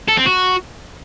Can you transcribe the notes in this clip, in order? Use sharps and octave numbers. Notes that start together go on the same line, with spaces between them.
A4
C4
F#4